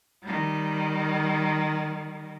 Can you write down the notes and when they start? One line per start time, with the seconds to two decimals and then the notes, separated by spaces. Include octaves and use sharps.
0.23 D#3 G3